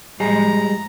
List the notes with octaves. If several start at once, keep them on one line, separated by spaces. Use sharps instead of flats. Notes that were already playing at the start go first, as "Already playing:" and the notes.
A2 F3 G3 G#3 G#4 A#5